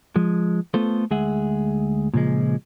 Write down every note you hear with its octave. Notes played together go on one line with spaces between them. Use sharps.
F3 G#3
A3 B3 F4 A4 C5
D2 G#3 G#4 E5 F#5
A#2 C#3 F3 G#3